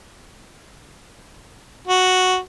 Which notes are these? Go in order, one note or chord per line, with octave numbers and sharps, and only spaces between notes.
F#4